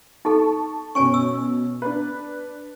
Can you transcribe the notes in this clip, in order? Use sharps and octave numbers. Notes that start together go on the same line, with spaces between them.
D#4 A4 A5 C#6
B2 C#4 C#5 G#5 C#6
E6
D4 B4